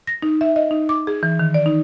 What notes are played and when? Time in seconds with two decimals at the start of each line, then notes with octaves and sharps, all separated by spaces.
0.07 A#6
0.23 D#4
0.41 E5
0.56 D#5
0.71 D#4
0.89 D6
1.07 G#4
1.23 E3
1.39 D#3
1.54 D5
1.66 D#4